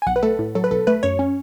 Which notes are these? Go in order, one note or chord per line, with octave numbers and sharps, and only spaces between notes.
G#5
B1 F#5
B4
A3 A4
A2
F#3 A4
B4
B1 A4
A3 B4
F#2 C#5
C#4